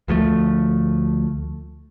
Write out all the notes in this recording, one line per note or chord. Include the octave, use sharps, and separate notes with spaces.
D2 F3 F#3 A3